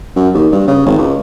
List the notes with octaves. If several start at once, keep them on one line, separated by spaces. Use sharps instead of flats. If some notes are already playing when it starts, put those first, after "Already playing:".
F#2
D#2
G2
C#3
G#1
C#2